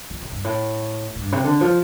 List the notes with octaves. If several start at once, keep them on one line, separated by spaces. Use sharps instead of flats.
F3
C3
G2
A2
A2
G2
C3
D3
F3